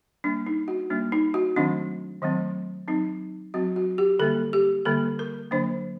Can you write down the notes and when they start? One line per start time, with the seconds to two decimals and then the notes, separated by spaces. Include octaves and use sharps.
0.24 G3 A#3 D4
0.47 D#4
0.68 F#4
0.90 G3 A#3 D4
1.12 D#4
1.34 F#4
1.56 D#3 F#3 A3 C4 D4
2.22 D#3 F#3 A3 C4
2.88 F#3 C4 D#4
3.54 F#3 C4 F#4
3.76 F#4
3.98 G4
4.19 D3 G3 A#3 A4
4.53 G4
4.85 D3 G3 A#3 A4
5.19 A#4
5.51 D3 F#3 A#3 D4 C5